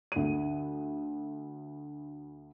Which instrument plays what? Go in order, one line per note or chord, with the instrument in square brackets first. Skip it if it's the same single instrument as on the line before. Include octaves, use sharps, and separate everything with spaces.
[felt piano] D2 D#7